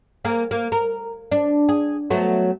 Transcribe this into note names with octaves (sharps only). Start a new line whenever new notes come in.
A#3 G#4 A#4
A#3
A#4
D4
G#4
F#3 A3 B3